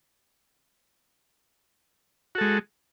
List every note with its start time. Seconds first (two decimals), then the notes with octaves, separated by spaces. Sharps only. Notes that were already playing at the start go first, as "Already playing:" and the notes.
2.35 F#4
2.38 A4
2.41 G#3